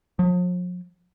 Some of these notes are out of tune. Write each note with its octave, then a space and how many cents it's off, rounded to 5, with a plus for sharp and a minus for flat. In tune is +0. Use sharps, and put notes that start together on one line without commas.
F3 +45